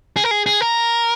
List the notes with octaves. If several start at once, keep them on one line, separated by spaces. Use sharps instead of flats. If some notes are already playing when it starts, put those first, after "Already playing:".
G#4
A#4
G#4
G#4
A#4